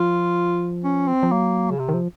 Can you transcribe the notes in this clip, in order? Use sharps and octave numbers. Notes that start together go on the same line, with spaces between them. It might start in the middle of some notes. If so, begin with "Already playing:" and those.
Already playing: F3 F4
C#4
C4
F3
F#3 A#3
C#3
C3
D#3
F3